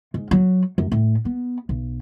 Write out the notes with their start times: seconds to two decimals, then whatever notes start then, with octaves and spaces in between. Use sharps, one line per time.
0.14 G#2
0.31 F#3
0.78 F#2
0.92 A2
1.25 B3
1.69 B1